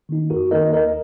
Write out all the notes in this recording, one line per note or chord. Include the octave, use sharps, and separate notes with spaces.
D#3 A#3 D#4
F#2 F#4 A#4
D#3 A#3 D#4 A#4 D#5
D#2 A#4 D#5